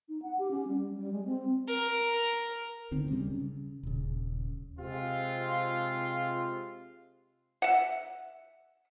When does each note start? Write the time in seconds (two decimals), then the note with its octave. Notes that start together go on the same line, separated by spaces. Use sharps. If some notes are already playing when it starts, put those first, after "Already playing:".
0.09 D#4
0.22 F#5
0.39 G4
0.51 C#4
0.68 G3
0.96 G3
1.12 G#3
1.25 C4
1.68 A#4
2.91 D2 D3 D#3 C4
3.10 C#3 G3 C#4
3.34 C#3
3.83 D#1 C#3
4.79 C3 G#3 C4 F4
7.62 E5 F#5